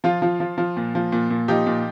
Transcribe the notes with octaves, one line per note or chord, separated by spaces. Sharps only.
F3 F4
F3
F3
F3
A#2
F3
A#2
A#2
F3 D#4 G4
A#2